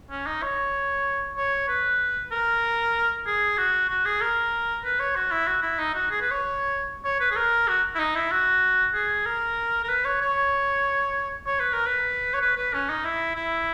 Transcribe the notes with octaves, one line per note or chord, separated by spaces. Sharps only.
C#4
D#4
C#5
C#5
B4
A#4
G#4
F#4
F#4
G#4
A#4
B4
C#5
F#4
E4
F#4
E4
D#4
F#4
G#4
B4
C#5
C#5
B4
G#4
A#4
F#4
E4
D#4
E4
F#4
G#4
A#4
A#4
B4
C#5
C#5
C#5
B4
A#4
B4
C#5
B4
B4
C#4
D#4
E4
E4